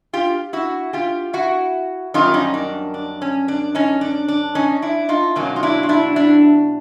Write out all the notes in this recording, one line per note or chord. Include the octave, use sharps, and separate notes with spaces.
F4 G4
E4 F#4
F4 G4
E4 F#4
F#2 D#3 G3 A#3 D#4 F4
C#4 D#4
D4
D4
C#4
D4
C#4 D#4
D4
D4
C#4 D#4
D4 E4
D#4 F4
E2 B2 F#3 A#3 C#4 D#4
F4
D4 E4
F4
D4 E4
D4 E4